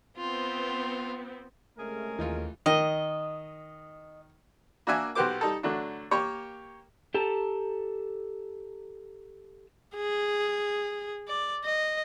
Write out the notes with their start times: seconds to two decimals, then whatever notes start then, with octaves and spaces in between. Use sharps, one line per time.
0.17 B3 C4 F4
1.78 C3 G#3 A3 C#4 G#4 A#4
2.18 D#2 E3 D#4 F4
2.66 D#3 D#5
4.87 A#3 D4 F#4 E5 G#5
5.15 B1 B3 F#4 G4 C5 D6
5.41 G3 D#4 A4
5.63 D3 F#3 A3 D4
6.11 A#3 G4 C#5
7.14 G4 A4 A5 A#5
9.95 G#4
11.28 D5
11.65 D#5